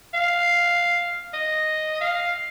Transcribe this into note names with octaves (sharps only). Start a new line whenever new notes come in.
F5
D#5
F5